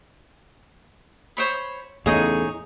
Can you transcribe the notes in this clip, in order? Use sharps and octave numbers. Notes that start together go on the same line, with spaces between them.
C5 C#5 B5
E2 A2 C#3 D#4 G#4 C#5